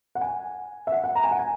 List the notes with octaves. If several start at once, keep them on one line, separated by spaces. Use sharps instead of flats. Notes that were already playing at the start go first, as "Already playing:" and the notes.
F#5
G#5
E5
F#5
F#5
A#5
G#5
F#5
G#5